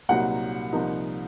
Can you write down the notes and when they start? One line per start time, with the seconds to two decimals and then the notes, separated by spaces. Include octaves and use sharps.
0.09 C2 A#2 F#3 A#3 D#4 F#5
0.73 C2 A#2 F3 A#3 D#4